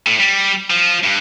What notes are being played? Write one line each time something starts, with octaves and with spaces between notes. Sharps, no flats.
A2
G3
F3
G2